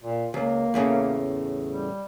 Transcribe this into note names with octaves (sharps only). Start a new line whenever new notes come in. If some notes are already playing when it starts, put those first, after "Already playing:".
A#2
C#2 A#3
E2 A2 C#3
G3